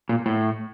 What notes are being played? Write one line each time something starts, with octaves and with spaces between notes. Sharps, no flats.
A#2
A2